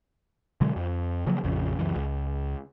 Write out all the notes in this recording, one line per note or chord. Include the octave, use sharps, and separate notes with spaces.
B2 D3 F#3 G#3
F2
C#3 F3 F#3 A#3
A#1 F2 C#3 F3
C#2 F#2 E3
C#2